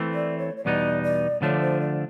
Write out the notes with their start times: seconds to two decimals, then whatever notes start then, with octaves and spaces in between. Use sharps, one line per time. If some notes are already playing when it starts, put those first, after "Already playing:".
Already playing: E3 A3 C4
0.14 D5
0.39 C#5
0.57 C#5
0.65 E2 B2 G3 B3 D#4 D5
1.03 D5
1.42 D3 F3 A3 D4 C#5
1.61 C5
1.81 D5